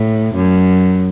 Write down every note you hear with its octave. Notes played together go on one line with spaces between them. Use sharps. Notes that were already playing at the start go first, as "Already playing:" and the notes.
Already playing: A2
F#2